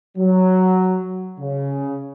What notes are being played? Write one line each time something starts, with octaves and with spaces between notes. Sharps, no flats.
F#3
C#3